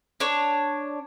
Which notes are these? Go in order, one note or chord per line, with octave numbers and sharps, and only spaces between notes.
D4 C#5